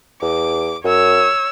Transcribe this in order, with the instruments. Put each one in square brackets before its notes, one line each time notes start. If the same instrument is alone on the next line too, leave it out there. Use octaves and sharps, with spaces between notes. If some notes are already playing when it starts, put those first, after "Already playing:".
[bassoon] E2 [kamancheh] D6
[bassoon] F#2 [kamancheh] C#5 E6